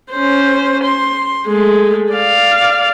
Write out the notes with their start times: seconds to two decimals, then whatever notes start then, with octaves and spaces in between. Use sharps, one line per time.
0.11 C#4 C5
0.84 C6
1.47 G#3 A3
2.12 D5 F5